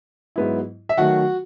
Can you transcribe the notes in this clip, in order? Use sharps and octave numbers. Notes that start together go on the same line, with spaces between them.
G#2 F#3 B3 E4
E5
D#3 F#3 A3 F#4 F#5